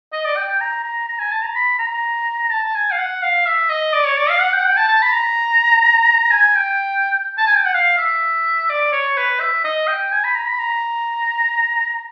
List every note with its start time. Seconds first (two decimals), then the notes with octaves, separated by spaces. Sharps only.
0.12 D#5
0.25 D5
0.37 G5
0.48 G5
0.61 A#5
0.84 A#5
1.08 A#5
1.20 G#5
1.32 A5
1.44 A#5
1.55 B5
1.79 A#5
2.51 A5
2.75 G#5
2.92 F5
2.98 F#5
3.23 F5
3.46 E5
3.70 D#5
3.93 D5
4.06 C#5
4.18 D5
4.30 F5
4.41 F#5
4.53 G5
4.59 F#5
4.65 G5
4.77 A5
4.88 A5
5.02 B5
5.13 A#5
6.31 G#5
6.55 G5
7.38 A5
7.47 G#5
7.56 G5
7.66 F#5
7.75 F5
7.98 E5
8.70 D5
8.92 C#5
9.17 B4
9.40 E5
9.64 D#5
9.88 G5
10.12 G#5
10.24 B5
10.35 A#5
10.47 B5
10.59 A#5